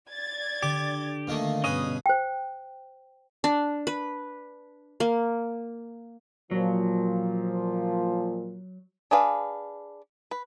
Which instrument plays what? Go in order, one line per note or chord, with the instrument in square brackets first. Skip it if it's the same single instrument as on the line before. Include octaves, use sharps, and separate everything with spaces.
[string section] D5 G#6 A6
[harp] D3 [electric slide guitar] G4 [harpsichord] D6
[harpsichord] A#2 D#3 A3 [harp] B3 D#5 F5
[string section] G2 B2 [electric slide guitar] C#4 D#5 [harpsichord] G#4 B4 [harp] F#5
[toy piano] C5 G5
[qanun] D4
B4
A#3
[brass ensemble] A#2 F3 [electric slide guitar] F#3
[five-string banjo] D4 G#4 B4 F5
B4